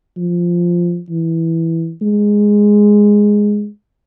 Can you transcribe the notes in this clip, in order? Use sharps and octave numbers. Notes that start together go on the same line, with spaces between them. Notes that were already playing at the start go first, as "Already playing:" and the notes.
F3
E3
G#3